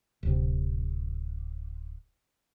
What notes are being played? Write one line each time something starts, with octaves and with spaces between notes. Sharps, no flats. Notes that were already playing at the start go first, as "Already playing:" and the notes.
D1 C3